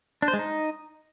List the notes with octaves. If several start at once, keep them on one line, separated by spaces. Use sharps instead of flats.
D4
C5
G#3
D#4